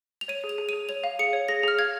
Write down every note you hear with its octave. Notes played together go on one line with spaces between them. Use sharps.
F7
C#5 D#7
G#4
F7
G#4
G#4 D#7
C#5 F7
F5
G#4 C#7
C#5
G#4 A#6
G#4 F6
F5 G#6